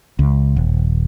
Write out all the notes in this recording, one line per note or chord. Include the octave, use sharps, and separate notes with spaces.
C#2
D#1